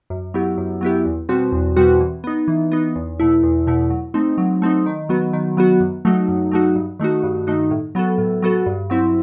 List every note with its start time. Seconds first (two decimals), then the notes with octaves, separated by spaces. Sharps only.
0.10 F#2
0.34 F#3 B3 E4 G4
0.58 F#2
0.81 F#3 B3 E4 G4
1.05 E2
1.29 B2 G3 C4 F#4
1.52 E2
1.77 B2 G3 C4 F#4
2.00 E3
2.24 B3 D#4
2.48 E3
2.72 B3 D#4
2.96 E2
3.20 B2 A3 E4
3.43 E2
3.67 B2 A3 E4
3.90 F#3
4.14 A3 C4 D#4
4.38 F#3
4.62 A3 C4 D#4
4.86 D#3
5.09 F#3 B3 F#4
5.33 D#3
5.57 F#3 B3 F#4
5.80 F#2
6.05 F#3 A3 D#4 F#4
6.28 F#2
6.52 F#3 A3 D#4 F#4
6.76 G2
6.99 D#3 A3 D#4 F#4
7.23 G2
7.47 D#3 A3 D#4 F#4
7.71 A2
7.95 F#3 B3 F#4 A4
8.18 A2
8.42 F#3 B3 F#4 A4
8.66 G2
8.90 F#3 C4 E4